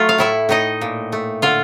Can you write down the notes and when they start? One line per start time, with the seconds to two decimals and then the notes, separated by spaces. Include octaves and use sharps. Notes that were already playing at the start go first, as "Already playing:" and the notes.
Already playing: F#3 A3 F4
0.09 F5
0.18 A2 E4 E5
0.49 A2 D#4 D#5
0.81 A#2
1.12 A3
1.42 D3 F4 F5